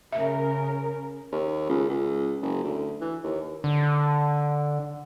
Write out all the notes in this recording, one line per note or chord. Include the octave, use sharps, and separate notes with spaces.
C#3 A#4 E5
D#2
C#2
C#2
F#1
D2
E3
D#2
D3